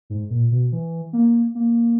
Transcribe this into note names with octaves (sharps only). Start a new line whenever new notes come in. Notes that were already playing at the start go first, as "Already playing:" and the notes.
G#2
A#2
B2
E3
A#3
A#3